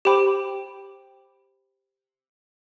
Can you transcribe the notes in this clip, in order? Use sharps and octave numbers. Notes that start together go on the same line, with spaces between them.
G4 C5 G5 B5 D6